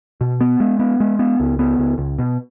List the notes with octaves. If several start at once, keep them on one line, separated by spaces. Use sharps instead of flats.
B2
B3
G#3
B3
G#3
B3
C#2
B3
C#2
C#2
B2